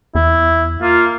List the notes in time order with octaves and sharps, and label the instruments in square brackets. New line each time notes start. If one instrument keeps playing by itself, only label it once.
[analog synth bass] E2 [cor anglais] E4
[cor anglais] A#3 [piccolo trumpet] F4